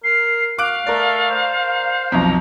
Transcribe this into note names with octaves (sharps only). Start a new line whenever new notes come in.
A#4 C7
F#4 F5 D6 F#6 D7
A3 A#4 D5
C5
B1 F2 A#5